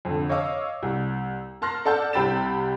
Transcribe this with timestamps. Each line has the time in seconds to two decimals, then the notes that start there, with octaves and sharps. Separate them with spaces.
0.05 F2 D3
0.29 C#5 D#5 F5 D6 E6
0.83 C2
1.62 A#4 A5 C6 F6 F#6 A#6
1.85 A4 D5 F#5 A5 E6 G6
2.13 C2 C3 G5 B5 A6 E7